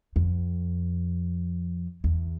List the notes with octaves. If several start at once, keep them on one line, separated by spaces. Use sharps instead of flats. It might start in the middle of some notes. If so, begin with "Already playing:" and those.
F2
E2